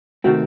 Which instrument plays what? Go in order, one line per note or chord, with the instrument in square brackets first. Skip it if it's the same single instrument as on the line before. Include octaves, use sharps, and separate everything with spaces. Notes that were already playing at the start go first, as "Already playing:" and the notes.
[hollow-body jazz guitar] C3 D#3 A3 C4 [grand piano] F#4